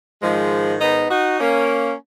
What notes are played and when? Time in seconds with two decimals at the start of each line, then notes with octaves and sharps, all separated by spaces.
0.21 G#2 D#3 F3 G#3
0.80 B3 D#4
1.10 D#4 F#4
1.39 A#3 C#4